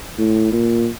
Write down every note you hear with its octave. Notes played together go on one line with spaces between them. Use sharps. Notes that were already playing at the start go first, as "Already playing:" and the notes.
A2
A#2